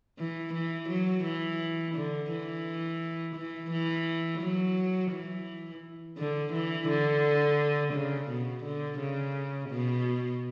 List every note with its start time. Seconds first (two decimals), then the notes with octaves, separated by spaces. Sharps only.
0.18 E3
0.54 E3
0.89 F#3
1.24 E3
1.95 D3
2.31 E3
3.36 E3
3.71 E3
4.41 F#3
5.11 E3
6.18 D3
6.53 E3
6.88 D3
7.93 C#3
8.29 B2
8.63 D3
8.99 C#3
9.69 B2